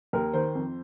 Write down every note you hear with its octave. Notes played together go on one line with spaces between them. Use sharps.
D#2 A#4
D#3 C5
F2